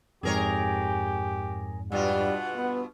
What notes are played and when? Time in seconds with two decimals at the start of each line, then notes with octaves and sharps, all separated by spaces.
0.23 F2 G#2 G#3 G4 G#4 A#4 C#5
1.92 G2 B2 G3 F4 F#5
2.56 B3